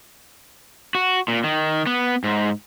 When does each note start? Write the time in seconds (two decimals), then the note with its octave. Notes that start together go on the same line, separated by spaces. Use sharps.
0.95 F#4
1.28 A#2
1.44 D#3
1.87 B3
2.24 G#2